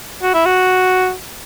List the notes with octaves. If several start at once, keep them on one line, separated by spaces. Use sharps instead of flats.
F#4
E4
F#4